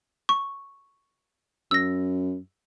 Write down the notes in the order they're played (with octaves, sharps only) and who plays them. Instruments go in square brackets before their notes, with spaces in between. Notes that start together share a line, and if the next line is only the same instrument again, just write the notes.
[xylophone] C#6
[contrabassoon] F#2 [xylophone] E6 A#6